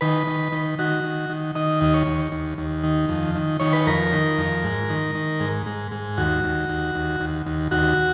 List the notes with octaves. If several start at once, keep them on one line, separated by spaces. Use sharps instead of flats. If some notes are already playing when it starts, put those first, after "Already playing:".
D#3 B4
D#3
D#3
D#3 F#4
D#3
D#3
D#3 D#5
D#2 D#5
C#5
D#2
D#2
D#2
D#3
F2
D#3
D#3 C#5
B4
F2 A#4
D#3
F2
G#2
D#3
D#3
G#2
G#2
G#2
D#2 F#4
D#2
D#2
D#2
D#2
D#2
D#2 F#4